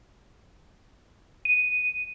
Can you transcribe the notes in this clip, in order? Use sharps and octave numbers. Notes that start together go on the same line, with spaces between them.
D#7